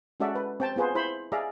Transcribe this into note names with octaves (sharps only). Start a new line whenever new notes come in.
G#3 C#4 F#4 A4 D5 E5
B4
C4 G5 A5
B3 F4 G#4 B4 C5
E4 C5 B5
G#4 D5 E5 F5 A#5